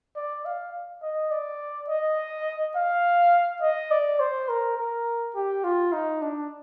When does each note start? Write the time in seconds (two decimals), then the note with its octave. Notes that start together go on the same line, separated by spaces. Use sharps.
0.16 D5
0.45 F5
1.02 D#5
1.31 D5
1.89 D#5
2.76 F5
3.62 D#5
3.91 D5
4.20 C5
4.49 A#4
4.78 A#4
5.35 G4
5.64 F4
5.93 D#4
6.22 D4